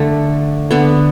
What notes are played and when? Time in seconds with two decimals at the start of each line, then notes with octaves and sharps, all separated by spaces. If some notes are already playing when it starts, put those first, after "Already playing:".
Already playing: D3 A3
0.71 D3 B3